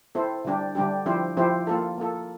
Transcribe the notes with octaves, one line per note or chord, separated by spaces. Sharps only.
C4 E4 A4 C5
D3 G3 D4 G4
D3 G3 D4 G4
F3 C4 E4 G4 C5
F3 C4 E4 G4 C5
A#3 F4 A4
A#3 F4 A4